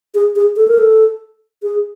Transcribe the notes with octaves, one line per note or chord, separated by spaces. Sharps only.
G#4
G#4
A4
A#4
A4
G#4